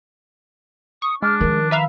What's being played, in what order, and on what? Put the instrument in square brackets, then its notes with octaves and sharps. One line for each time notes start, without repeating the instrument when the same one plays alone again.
[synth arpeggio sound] C#6 [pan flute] D#6
[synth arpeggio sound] G#3 [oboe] D4 [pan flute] F6
[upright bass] D#3 F3 [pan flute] A#4
[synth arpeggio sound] B4 E5 F5 [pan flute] A#5